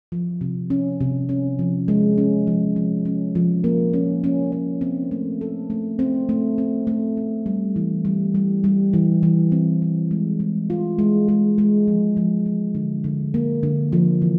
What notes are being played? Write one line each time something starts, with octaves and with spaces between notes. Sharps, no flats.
F3
C3
C#4
C3
C#4
F3
G#3
C#4
F3
F3
C#4
F3
A#3
C#4
C#4
C#4
C4
A3
A4
A3
C4
A3
C4
A3
C4
G3
E3
G3
G3
G3
E3
E3
C4
C4
G#3
G#3
F4
G#3
G#3
G#3
F3
F3
F3
D3
D3
A#3
D3
F3
E3